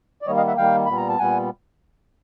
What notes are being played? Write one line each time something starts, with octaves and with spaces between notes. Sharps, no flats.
D5
D#3 G3 A#3 C#5 D#5
D#5 F5
E5 F#5
D#3 G3 A#3 F5 G5
A#2 G3 B3 B5
A#5
A5
A#2 G3 B3 F#5 G#5